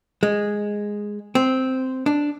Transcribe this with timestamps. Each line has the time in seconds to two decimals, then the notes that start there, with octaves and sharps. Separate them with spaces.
0.23 G#3
1.35 C4
2.06 D4